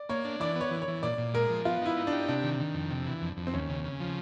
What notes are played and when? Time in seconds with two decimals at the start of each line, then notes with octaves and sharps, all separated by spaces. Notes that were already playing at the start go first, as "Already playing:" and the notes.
Already playing: D5
0.09 A#3 C#5
0.25 D4
0.40 E3 D5
0.56 B3 C#5
0.71 E3
0.82 C#5
0.88 E3
1.02 A#2 D5
1.18 A#2
1.34 G#3 A#4
1.49 F3
1.65 B3 F4
1.81 D#4 E4
1.97 D#4
2.07 D4
2.12 G4
2.28 C3 D4
2.43 D#3
2.59 D#3
2.75 F2
2.90 C3
3.06 E3
3.22 F2
3.37 F2
3.47 C4
3.54 D#2 C#4
3.69 C#3
3.84 C#3
4.00 F3